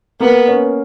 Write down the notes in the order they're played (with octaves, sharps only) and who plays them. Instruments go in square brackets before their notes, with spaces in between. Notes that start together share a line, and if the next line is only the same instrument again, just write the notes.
[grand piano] A#3 [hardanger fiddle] B3
[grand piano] C#4